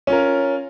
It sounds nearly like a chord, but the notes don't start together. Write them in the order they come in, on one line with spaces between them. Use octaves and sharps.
C#4 F4 A#4